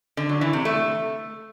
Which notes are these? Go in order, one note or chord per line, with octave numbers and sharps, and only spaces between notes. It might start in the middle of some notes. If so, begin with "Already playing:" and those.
D3
F#3
E3
C3
A3